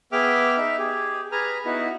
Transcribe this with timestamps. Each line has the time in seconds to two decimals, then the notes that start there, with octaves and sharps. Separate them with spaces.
0.12 B3 G#4 E5 G5 D6 F6
0.57 D#4 E5
0.78 G4 G#4
1.32 G#4 B4 G#5 A#5 F6
1.65 B3 D#4 E4 F#4 B4